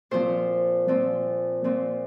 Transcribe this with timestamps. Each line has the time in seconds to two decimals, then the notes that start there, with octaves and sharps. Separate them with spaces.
0.11 A#2 F3 C4 C5
0.88 A#2 F3 C4
1.64 A#2 F3 C4